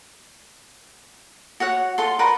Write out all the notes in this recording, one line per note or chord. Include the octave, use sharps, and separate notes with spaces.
F#4 C#5 F#5
F4 A4 C6
A#4 B4 D5 F#5